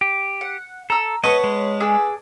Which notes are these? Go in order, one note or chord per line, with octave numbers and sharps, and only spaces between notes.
G4
F#5
A4 A#5 E6
B3 A4 B4 C#5 D#5 D#6
G#3
D4 G#4 E6